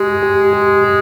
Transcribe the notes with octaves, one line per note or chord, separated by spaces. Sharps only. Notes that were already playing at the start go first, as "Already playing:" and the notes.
Already playing: G#3 G4
G4
G4
G4